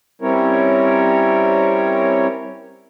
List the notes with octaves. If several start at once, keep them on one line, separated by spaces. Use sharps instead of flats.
G3 C4 C#4 E4 A#4 C#5